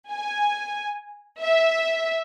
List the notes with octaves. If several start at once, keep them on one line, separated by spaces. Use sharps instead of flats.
G#5
E5